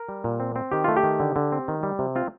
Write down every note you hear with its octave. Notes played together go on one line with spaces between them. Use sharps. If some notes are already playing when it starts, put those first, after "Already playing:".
Already playing: A#4
G3
A#2
C4
C4
D#3 G4
A3 F4
G4
D#3
D3
D3
C4
D#3
G3
C3
C4 F4